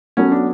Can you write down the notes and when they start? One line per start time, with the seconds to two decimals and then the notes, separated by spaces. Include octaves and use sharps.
0.17 F#3 B3 C#4 F#4 A4
0.32 D4